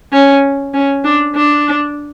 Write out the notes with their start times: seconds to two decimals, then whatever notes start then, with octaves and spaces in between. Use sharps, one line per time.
0.13 C#4
0.74 C#4
1.04 D4
1.35 D4